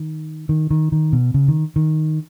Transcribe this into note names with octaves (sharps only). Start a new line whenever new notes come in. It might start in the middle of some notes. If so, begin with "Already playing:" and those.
Already playing: D#3
D#3
D#3
D#3
B2
C#3
D#3
D#3